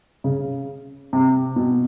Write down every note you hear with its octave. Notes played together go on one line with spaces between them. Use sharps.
C#3
C3
B2